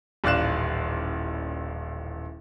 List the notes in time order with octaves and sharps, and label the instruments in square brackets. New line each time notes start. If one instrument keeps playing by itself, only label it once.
[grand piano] D#1 A1 D5 F5 F#6 E7